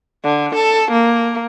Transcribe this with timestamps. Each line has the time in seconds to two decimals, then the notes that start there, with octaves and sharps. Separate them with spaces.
0.24 D3
0.55 A4
0.92 A#3